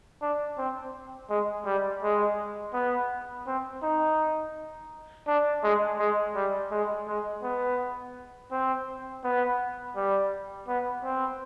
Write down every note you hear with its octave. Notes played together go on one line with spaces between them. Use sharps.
D4
C4
G#3
G3
G#3
B3
C4
D#4
D4
G#3
G#3
G3
G#3
G#3
B3
C4
B3
G3
B3
C4